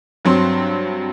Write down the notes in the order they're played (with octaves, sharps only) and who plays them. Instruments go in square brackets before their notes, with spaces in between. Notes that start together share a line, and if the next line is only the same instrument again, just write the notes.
[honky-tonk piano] G2 F#3 C4 C6